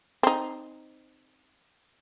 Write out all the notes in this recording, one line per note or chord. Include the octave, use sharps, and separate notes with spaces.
C4 D#4